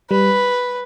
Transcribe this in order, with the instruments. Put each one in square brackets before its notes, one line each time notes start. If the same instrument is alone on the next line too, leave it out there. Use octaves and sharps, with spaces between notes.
[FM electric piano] G3 [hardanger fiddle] B4